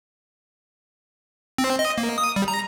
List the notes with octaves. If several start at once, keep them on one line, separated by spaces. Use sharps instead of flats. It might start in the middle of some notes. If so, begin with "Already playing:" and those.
C4
D#5
A#3
D#6
G3
A#5